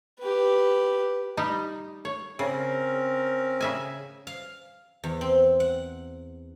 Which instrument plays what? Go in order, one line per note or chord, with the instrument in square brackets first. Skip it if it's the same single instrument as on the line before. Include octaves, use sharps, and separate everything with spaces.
[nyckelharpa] G4 B4
[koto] G3 D#4 G4
C#5
[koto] C#3 [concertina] C4 C#4 A#4
[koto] C#3 E5 G#5
[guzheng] F5
E2
C4
F#5